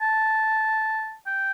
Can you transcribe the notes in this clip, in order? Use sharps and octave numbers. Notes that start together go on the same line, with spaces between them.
A5
G5